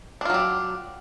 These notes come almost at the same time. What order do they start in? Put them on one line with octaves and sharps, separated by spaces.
D4 F4 F#3 G4